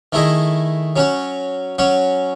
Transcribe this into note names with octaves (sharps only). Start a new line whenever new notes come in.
D#3 A3 E4 G#4 D#5
F#3 C#4 F#4
F#3 C#4 F#4